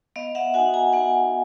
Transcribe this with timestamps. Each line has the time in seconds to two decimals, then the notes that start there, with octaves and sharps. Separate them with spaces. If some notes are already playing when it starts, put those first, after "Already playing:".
0.16 B3 D#5 F5
0.35 E5 F#5
0.54 F#4 F#5 G#5
0.58 D#4
0.73 G#5 A#5
0.93 B3 F#5 G#5